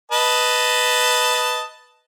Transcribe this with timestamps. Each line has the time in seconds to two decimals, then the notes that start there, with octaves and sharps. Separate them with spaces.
0.12 B4 D#5 A5